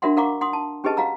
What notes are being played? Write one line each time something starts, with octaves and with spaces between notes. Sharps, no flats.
D4 F#4 A#4 E5 F#5 C6
A#4 F5 F#5 A#5 C#6 D6
F#5 C6 D#6
A5
C#4 G4 G#4 B4 D#5 A5
F#4 F5 F#5 A#5 E6